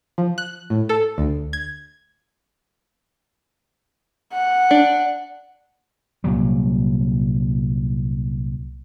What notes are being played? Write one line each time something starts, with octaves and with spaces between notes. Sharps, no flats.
F3
F#6
A2
A4
D2
G#6
F#5
D4
C2 A#2 F#3 G3